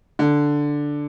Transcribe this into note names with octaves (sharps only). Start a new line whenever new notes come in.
D3